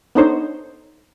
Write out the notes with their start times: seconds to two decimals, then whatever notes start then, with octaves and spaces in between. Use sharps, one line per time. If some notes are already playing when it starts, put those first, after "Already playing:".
0.15 B3 D4 D#4 A4 C5 C#5